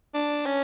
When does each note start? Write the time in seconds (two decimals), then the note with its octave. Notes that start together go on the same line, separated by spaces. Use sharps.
0.14 D4
0.46 C#4